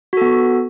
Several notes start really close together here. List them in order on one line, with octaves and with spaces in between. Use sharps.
F#4 A4 B3